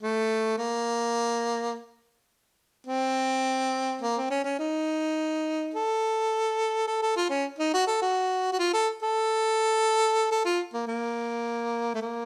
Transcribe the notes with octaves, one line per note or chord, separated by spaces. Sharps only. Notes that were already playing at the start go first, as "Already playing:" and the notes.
A3
A#3
C4
A#3
C4
C#4
C#4
D#4
A4
A4
A4
F4
C#4
D#4
F#4
A4
F#4
F#4
F4
A4
A4
A4
F4
A#3
A#3
A3
A#3